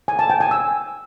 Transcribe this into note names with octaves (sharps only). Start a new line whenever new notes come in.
G#5
A5
G5
G#5
E6